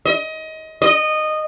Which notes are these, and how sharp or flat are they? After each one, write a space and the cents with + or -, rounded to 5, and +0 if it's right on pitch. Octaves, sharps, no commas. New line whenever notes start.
D#5 +25
D#5 -15